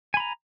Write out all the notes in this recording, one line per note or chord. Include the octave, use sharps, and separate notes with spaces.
G#5 A#5 B5